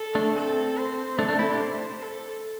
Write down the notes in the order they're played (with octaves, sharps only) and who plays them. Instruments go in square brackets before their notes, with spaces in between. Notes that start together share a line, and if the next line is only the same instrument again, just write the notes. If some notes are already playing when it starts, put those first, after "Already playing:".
Already playing: [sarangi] A4
[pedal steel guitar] A3 D4
[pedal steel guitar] C4 [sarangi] A4
[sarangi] C5
[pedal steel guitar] A3 D4 [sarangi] A4
[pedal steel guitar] A3 D4
C4 E4
D4 G4
[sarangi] C5
A4